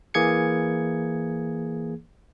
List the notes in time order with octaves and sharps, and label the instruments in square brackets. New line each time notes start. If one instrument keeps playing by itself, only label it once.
[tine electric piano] E3 A#3 G#4 G#6 C#7